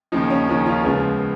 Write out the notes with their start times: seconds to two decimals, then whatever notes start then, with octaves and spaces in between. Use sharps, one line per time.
0.12 D#2 C#3 F3 D#4
0.30 C#4
0.48 D#2 C#3 F3 D#4
0.66 C#4 F4
0.84 C#2 C#3 F3 B3 F4 G#4